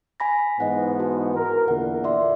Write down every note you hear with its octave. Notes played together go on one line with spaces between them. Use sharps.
G#5 B5 A#6
G#2 E3 B3 D#5 F#5
F#4 A5
A#4
E2 A#2 D3 F#5
D5 E5 C6